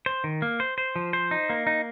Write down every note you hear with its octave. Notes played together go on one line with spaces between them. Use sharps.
C5
D#3
A#3
C5
C5
F3
C5
D#4
A#3
D#4